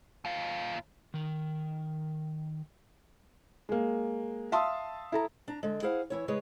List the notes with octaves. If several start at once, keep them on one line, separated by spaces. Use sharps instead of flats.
D#2 F4
D#3 A#4
G#3 A#3
E5 F5 A5 C6 D#6 E6
E4 A4 A#5
D4 A#5
D3 G#3
E4 G#4 C5 F5 F#5
E3 E4 C#5
C#3 G#3 G#4 B4 C#5